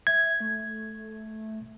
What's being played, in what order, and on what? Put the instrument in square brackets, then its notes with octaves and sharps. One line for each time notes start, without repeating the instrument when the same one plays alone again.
[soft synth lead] E5 [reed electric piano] G#6
[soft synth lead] A3